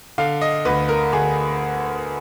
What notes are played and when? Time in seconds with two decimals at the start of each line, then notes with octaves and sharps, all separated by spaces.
0.18 D3 F5
0.41 D#5
0.65 D2 B4
0.89 A#4
1.13 D2 G#4